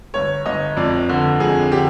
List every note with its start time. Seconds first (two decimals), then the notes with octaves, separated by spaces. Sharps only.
0.14 G1 C#5
0.46 G1 D#5
0.77 F2 D5
1.09 D3
1.40 F2 G#4
1.71 D3 G4